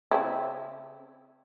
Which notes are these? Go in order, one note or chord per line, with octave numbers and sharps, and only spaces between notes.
C#3 C4 E4